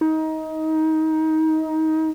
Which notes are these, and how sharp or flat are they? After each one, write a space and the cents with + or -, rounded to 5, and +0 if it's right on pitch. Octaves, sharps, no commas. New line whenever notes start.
D#4 +20